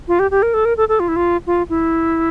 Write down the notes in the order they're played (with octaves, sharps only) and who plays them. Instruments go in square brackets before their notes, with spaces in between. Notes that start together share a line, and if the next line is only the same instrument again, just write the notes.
[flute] F4
G4
G4
A#4
A4
A#4
A4
A4
F4
E4
F4
F4
E4